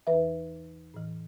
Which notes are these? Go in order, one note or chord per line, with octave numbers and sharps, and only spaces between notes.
E2 E3 B4 E5
A2 E3